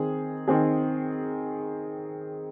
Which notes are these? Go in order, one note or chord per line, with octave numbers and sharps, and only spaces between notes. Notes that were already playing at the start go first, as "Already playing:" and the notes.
Already playing: D#3 C4 G#4
D#3 C4 G#4